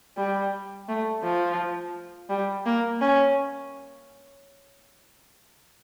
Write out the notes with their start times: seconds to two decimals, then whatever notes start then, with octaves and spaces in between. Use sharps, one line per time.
0.17 G3
0.89 A3
1.23 F3
2.30 G3
2.66 A#3
3.01 C#4